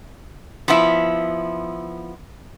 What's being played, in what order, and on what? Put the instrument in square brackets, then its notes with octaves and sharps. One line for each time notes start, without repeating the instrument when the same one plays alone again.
[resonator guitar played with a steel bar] F3 B3 E4